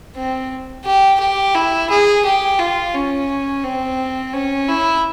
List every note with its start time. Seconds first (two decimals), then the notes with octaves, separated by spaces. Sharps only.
0.16 C4
0.85 G4
1.20 G4
1.55 E4
1.90 G#4
2.25 G4
2.59 F4
2.94 C#4
3.64 C4
4.33 C#4
4.68 E4